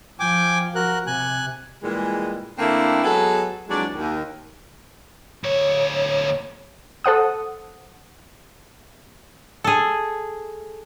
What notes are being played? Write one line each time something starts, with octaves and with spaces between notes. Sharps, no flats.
F3 G5 G#5 D6
F#4 A#4 F#6
C3 G#5 F#6
A#2 E3 G3 G#3
D3 A3 A#3 C4 D4 E4
F#3 G#3 B3 G#4 A4
F2 E3 F#3 G#3 D4 D5
D#2
D2 C#5
A4 C5 F#5 D#6
G#4 A4